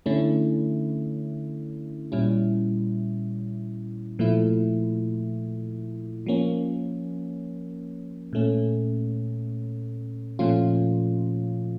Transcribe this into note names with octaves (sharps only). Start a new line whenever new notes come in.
D3 A3 C#4 E4
A#2 G3 C#4 E4
A#2 F3 A3 E4
F3 A#3 C#4
A#2 A3 C#4
A#2 F3 A3 C#4 F4